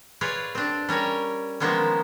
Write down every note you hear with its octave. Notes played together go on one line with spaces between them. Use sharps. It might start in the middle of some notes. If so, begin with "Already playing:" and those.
F4 G#4 B4 C#5 D5
C4 D4
G3 C#4 A#4 C#5
D#3 F3 G#3 A#3 B3 C#4